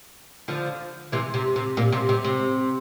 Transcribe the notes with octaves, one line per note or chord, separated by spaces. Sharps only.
D3 F3
C3 E3
C3
C3
A#2
C3
C3
C3